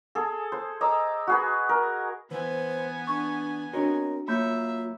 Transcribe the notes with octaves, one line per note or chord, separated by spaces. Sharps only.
G#4 A4
C5
D#5 A#5 D6 E6
F#4 G#4 B4
A#4
E3 B3 B4 C5 G#5
D4 C#6
C4 D4 F#4 A#4 C#5 D#5
F#3 A#3 F4 C#5 E5 B5 G6